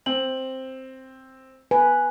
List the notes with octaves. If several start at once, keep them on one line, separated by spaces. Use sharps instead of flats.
C4 F#7
B4 G#5